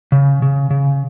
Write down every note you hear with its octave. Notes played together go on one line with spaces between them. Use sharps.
C#3
C#3
C#3